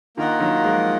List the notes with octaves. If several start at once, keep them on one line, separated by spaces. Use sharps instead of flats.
D#3 A#3 F4 A#4 D#5 F#5
D#3 F#3
F3 G#3